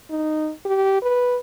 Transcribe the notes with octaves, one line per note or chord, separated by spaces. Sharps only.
D#4
G4
B4